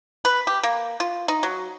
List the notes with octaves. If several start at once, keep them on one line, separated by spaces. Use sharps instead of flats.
B4
G4
A#3
F4
D#4
F#3